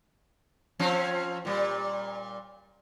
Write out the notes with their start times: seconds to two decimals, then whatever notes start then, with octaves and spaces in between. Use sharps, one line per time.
0.79 F3 C4 C#4
1.45 A#2 G3